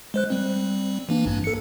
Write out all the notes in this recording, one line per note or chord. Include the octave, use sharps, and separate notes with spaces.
G#3 C5 F#6
G3 C4
E3 A#3 D4
A1 G2 D4
A4 C#7